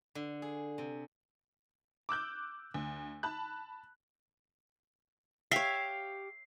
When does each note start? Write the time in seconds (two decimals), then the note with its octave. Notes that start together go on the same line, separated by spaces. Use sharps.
0.15 D3
0.42 G#4
0.78 C3
2.09 D6 E6 F#6 G6
2.74 D2
3.23 A5 B5 F#6
5.51 G4 C#5 E5 F5 C7